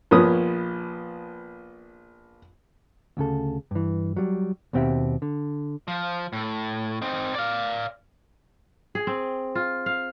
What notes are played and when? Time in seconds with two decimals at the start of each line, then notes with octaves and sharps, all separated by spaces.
0.11 A#1 F3 B3 C#5 D#6
3.17 D2 C#3 A4
3.71 G2 E3
4.17 F#3 G3
4.73 D#2 B2 C4 G4 E5
5.22 D3
5.88 F3
6.33 A2
7.02 C4 D#4
7.35 D5 F5
8.95 G#4
9.07 C4
9.55 F4
9.86 F5